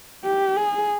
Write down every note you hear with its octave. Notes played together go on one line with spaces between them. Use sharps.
G4
G#4